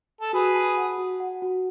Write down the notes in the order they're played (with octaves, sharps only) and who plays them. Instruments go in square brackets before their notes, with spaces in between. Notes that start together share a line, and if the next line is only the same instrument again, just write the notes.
[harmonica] A4
[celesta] F#4 [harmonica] G#4 B4
[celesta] A5
F#5
F#4
F#5
F#4